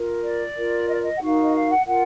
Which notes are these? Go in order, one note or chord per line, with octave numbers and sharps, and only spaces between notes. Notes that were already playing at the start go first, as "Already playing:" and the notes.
Already playing: F4 A#4
D5
F4 A#4
D#5
D5
D#5
F#5
D#4 F#4 A#4 F5
D#5
F5
F#5
F4 A#4 F#5